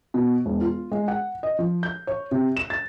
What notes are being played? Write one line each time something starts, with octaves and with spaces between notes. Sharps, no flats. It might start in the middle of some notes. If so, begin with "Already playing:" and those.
B2
E1
F4
G#3
F#5
D#5
F3
G6
C#5
C3
E7
A6